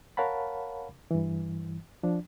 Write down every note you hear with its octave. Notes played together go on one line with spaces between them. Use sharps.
A#4 C#5 F5 F#5 A5 B5
G2 E3
F3 D4